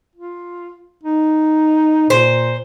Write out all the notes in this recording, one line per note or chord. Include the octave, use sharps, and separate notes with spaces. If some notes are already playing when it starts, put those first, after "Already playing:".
F4
D#4
A#2 C5